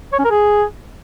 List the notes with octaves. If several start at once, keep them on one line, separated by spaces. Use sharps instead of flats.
C#5
C#4
A#4
G#4